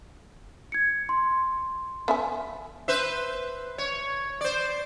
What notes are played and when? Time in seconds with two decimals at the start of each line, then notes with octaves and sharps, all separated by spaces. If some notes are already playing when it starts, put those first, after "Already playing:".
0.72 G#6 C#7
1.09 C6
2.08 B3 E5 G#5
2.88 B4 C5 E5
3.78 C#5
4.41 C5 D5